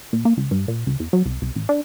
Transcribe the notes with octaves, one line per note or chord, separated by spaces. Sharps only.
A#2
A#3
C#2
G2
A#2
C#2
E2
F#3
C2
C2
A1
D4